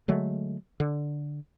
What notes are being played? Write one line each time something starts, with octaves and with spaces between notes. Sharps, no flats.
D3 F#3 G#3 A3
D3